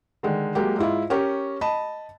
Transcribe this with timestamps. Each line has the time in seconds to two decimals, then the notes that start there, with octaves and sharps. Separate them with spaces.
0.23 D3 D#3 G#3
0.55 F#3 G#3 A#3 G4
0.78 G#2 E4 F4
1.10 C#4 G4 A#4 C#6
1.61 D#5 A5 B5